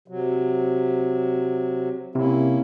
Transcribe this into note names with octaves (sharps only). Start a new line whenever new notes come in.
C3 F#3
C3 A#3 C#4 E4